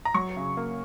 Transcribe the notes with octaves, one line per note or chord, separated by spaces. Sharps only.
A#5
F#3 C#6
C#3
A#3